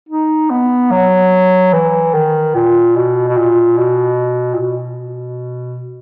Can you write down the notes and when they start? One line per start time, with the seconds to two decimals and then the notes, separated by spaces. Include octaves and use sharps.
0.09 D#4
0.50 B3
0.91 F#3
1.73 E3
2.14 D#3
2.55 A#2
2.96 B2
3.28 B2
3.37 A#2
3.78 B2
4.54 A#2
4.60 B2